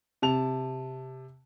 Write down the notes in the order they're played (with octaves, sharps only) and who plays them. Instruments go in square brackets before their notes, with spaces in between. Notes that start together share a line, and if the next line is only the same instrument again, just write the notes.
[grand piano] C3 A5 F7